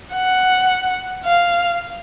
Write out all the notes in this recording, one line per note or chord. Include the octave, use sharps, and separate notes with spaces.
F#5
F5